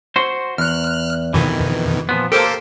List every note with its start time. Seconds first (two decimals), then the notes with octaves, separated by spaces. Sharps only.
0.16 F#4 C5
0.58 E2 F6 F#6
1.34 F2 B2 D#3 E3
2.09 A#2 F3 B3
2.32 A#3 G4 A4 A#4 C5